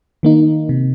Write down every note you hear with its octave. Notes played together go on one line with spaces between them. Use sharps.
D#3 A#3 D#4
C3